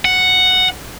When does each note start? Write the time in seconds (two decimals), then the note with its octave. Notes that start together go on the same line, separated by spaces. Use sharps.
0.05 F#5